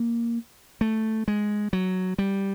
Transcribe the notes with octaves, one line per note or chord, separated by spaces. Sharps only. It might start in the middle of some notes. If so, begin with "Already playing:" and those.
Already playing: A#3
A3
G#3
F#3
G3